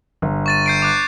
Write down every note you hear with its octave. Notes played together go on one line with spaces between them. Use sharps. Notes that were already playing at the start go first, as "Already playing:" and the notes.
G1
C#6 A6 D#7
G6 C7 D7
D6 F#6 C7